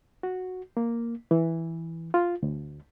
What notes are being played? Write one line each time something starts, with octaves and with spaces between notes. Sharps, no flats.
F#4
A#3
E3
F4
D2